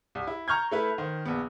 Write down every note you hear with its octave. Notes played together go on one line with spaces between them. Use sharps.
C2
E4
A#5 C#6 F6 G6 G#6
A3 E4 B4
D#3 C5
A#1 B3